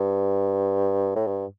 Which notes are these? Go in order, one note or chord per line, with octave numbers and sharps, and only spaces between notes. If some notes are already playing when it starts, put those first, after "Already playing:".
Already playing: G2
A2
G2